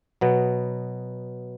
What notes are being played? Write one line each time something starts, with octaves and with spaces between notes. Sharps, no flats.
B2 F#3 B3